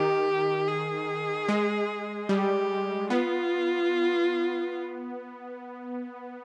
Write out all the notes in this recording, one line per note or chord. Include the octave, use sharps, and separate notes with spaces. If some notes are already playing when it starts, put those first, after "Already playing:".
Already playing: D#3 G4
G#4
G#3
G3 G4
B3 F4